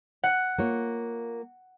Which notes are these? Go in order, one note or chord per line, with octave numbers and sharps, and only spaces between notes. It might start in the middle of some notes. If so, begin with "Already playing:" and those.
F#5
A#3 F4 C#5